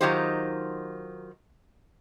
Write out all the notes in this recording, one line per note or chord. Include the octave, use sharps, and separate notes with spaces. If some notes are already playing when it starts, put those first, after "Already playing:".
D#3 F#3 D#4 F4 G4 C5